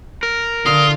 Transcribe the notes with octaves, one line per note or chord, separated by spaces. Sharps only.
A#4
D3 F4 D#6